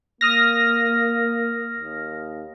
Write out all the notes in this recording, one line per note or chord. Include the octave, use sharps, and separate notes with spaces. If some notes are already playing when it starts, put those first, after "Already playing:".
A#3 D#6 F6 A#6
D#2